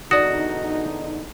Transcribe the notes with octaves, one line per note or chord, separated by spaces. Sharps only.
E2 D3 D#4 F#4 D5 D#6